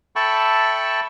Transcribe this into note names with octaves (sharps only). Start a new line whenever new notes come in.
A4 E5 G5 A5 B5 C#6